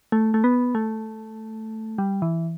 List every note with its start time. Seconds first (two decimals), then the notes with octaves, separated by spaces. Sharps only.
0.12 A3
0.34 A3
0.44 B3
0.75 A3
1.98 G3
2.22 E3